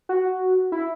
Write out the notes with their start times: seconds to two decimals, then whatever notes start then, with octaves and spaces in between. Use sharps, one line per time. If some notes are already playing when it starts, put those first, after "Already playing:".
0.09 F#4
0.72 E4